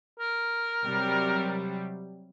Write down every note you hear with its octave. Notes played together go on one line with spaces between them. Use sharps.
A#4
C3 F#3 G3